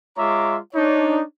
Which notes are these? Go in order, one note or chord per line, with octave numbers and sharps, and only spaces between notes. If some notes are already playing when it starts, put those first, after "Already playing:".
G#3 F4 C#5 E5 A#5 D6
D4 D#4 C#5